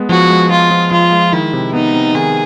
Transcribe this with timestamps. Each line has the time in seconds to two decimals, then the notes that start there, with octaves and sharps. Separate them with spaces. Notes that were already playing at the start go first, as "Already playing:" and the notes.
Already playing: G#3 B3
0.09 F3 F#4
0.30 G#3
0.50 G#3 F4
0.71 F3
0.91 F3 F4
1.12 G#3
1.33 D#3 E4
1.53 C3
1.74 B3 D#4
1.94 C3
2.15 D#3 G#4